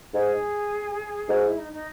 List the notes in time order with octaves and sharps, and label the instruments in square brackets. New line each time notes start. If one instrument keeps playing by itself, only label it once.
[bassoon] G#2 [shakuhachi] G#4
[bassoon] G#2 [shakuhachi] F#4
[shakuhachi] E4
D#4
D#4